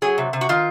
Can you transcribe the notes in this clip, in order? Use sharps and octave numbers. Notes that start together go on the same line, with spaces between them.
F#3 G#4
C3
C3
F#4
D#3 F4